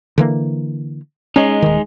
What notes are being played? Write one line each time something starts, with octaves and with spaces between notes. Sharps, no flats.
D3 E3 A#3
G#3 C#4 D#4
D#1 D#3